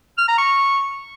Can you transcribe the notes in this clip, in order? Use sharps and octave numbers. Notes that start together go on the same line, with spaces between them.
F6
A#5
C#6